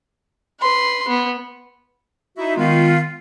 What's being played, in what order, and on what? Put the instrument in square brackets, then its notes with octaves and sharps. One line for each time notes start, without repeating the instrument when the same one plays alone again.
[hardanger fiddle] B4 C6
B3
[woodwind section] D#4 E4 F#4 E5
D#3 G#3 B3 F4